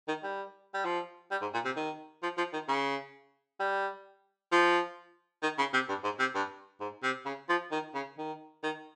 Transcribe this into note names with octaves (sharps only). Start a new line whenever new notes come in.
D#3
G3
G3
F3
G3
G#2
A#2
C3
D#3
F3
F3
D#3
C#3
G3
F3
D#3
C#3
C3
G2
G#2
C3
G2
G#2
C3
C#3
F3
D#3
C#3
D#3
D#3